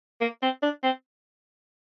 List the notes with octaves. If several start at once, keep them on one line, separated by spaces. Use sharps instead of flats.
A#3
C4
D4
C4